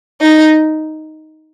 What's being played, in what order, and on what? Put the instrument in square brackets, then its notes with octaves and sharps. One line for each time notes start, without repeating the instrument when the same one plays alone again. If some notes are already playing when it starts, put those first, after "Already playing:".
[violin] D#4